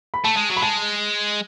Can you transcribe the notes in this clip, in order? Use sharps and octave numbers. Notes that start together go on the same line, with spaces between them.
B5
A3 A5
G#3
F#3
B5
G#3 A5